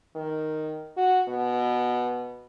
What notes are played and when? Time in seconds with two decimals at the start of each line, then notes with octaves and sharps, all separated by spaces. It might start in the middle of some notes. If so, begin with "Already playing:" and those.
0.15 D#3
0.97 F#4
1.28 B2